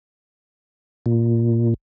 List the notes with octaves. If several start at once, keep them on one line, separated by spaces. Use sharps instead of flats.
A#2